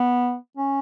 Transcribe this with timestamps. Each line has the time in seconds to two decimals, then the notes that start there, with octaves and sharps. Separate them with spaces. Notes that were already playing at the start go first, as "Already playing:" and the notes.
Already playing: B3
0.57 C#4